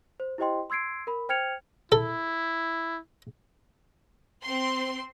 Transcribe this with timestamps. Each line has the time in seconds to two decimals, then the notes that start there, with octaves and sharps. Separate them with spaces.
0.20 C5
0.38 E4 G4 C5 D#5 G5 C6
0.70 C6 E6 G#6 C7 D7
1.07 A#4 B5
1.29 C5 G5 F6 G#6 C#7 F7
1.92 E4 A4
4.43 C4 C6